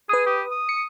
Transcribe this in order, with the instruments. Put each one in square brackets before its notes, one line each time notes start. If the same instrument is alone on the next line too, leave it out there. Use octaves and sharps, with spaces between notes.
[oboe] G#4 [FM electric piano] B4 D#6
[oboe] G4
D#6
[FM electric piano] C#7